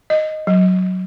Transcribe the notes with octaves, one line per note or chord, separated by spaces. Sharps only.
D#5
F#3